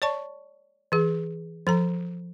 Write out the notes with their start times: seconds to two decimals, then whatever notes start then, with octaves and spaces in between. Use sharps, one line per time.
0.02 C#5 D5 A5 C#6
0.92 E3 G#4
1.67 F3 A4 A#5